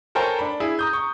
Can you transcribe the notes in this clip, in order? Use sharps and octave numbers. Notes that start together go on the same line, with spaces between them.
A4 A#4 C5 C#5 G5 G#5
D4 B5
E4 G#4
A#5 D#6 G6
C#6